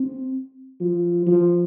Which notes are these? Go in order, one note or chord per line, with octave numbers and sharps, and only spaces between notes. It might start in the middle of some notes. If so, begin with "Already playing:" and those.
Already playing: C4
F3
F3